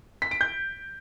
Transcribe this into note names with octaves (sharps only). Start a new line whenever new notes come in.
B6
D7
G6